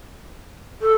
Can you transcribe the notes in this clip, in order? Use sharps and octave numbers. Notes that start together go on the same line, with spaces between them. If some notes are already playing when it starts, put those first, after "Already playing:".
A4